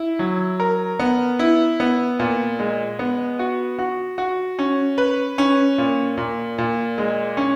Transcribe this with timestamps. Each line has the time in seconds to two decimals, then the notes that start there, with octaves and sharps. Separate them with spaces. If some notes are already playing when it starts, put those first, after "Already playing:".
Already playing: E4
0.19 F#3
0.60 A#4
0.99 B3
1.39 E4
1.80 B3
2.19 A#2
2.59 G#3
2.99 B3
3.39 F#4
3.79 F#4
4.18 F#4
4.59 C#4
4.98 B4
5.38 C#4
5.78 A#2
6.17 A#2
6.58 A#2
6.98 G#3
7.37 C#4